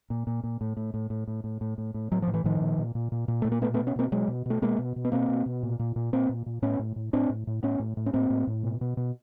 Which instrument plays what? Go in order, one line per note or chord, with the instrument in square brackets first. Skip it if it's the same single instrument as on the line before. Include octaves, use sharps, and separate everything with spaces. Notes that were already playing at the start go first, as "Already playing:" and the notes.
[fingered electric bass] A#2
A#2
A#2
A2
A2
A2
A2
A2
A2
A2
A2
A2
A2 F#3
F3
A2
E3
A2 D#3 F3
A#2
A#2
A#2
A#2
A#2
A#2 A3
A#3
B2 A3 B3
A3 B3
B2
B3 C#4
B2 A#3 C4
B2 F#3 G#3
B2
B2 A3
B2 G#3 A#3
B2
B2
B3
B2 A#3 C4
B2
B2
A#2
A#2
A#2
A#2 A#3 C4
A#2
A#2
A2 B3 C#4
A2
A2
A2 C4 D4
A2
A2
A2 B3 C#4
A2
A2
C#4
A2 A#3 C4
A2
A2
B2
B2
B2